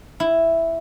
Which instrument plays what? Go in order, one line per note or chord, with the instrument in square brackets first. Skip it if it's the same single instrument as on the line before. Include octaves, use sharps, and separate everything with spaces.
[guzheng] E4